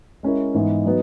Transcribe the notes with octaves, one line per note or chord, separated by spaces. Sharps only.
G#3 C#4 E4 A#4
G#2 E3 B3 D#4
F#3 B3 D#4